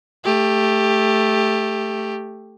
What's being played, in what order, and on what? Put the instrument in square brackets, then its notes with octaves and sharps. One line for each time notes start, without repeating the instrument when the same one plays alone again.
[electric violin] A3 G4